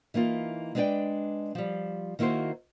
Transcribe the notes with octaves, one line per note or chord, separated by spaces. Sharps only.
E3 A#3 D#4 F4
G#3 D4 B4 C#5 D5 G5
F3 G3
D#3 A#3 E4 F#4 C5